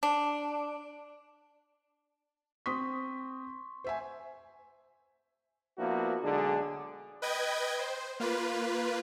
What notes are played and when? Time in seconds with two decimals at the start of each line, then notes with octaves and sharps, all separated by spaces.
0.03 D4
2.66 C4 C6 C#6 D#6 B6
3.84 C5 E5 G#5
5.78 F3 A#3 B3 D4 E4 F#4
6.22 B1 D3 G#3 D4 G#4
7.22 B4 D#5 G5 G#6
7.79 C5
8.20 A#3 F4 B4